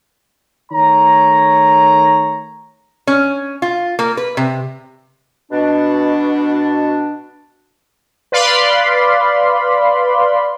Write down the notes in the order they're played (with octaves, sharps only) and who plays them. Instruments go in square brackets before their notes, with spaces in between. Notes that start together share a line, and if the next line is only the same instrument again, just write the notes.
[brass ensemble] D#3 A3 C#5 A#5
[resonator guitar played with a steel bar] C#4
F4
A#3
B4
C3
[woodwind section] B2 D4
[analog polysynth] B4 D5 F5 B5 C6